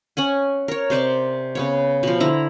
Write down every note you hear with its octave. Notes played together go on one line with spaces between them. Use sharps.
C#4 F#5 G#5
A#4 C#5
C3 C5 D5 C#6
C#3 B3 C#5
B2 F3
D3 E4 A#5